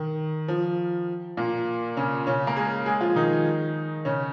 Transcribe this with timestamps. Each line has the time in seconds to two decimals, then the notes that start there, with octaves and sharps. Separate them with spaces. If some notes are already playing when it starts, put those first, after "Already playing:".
Already playing: D#3
0.48 F3
1.37 A#2 A#3
1.97 C#3 C#4
2.27 C#3 C#4
2.47 A#3 A#4
2.56 G#3 G#4
2.86 G#3 G#4
3.01 F3 F4
3.16 D#3 D#4
4.05 C#3 C#4